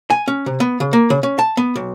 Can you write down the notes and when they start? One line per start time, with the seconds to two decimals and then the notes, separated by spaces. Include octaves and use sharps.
0.10 G#5
0.28 C#4
0.46 C3
0.60 B3
0.80 C#3
0.93 A#3
1.10 C#3
1.23 C#4
1.39 A5
1.57 B3
1.76 B1